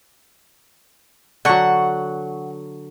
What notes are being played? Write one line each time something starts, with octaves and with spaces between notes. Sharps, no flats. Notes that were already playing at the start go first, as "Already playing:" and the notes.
D3 F#3 F#5 C#6